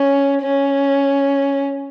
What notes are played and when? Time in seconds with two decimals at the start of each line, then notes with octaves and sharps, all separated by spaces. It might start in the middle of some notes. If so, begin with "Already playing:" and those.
Already playing: C#4
0.42 C#4